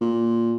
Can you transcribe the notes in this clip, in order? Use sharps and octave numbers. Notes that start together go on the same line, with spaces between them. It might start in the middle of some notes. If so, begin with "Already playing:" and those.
A#2